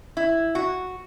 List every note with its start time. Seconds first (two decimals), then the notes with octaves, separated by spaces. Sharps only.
0.17 E4
0.55 F#4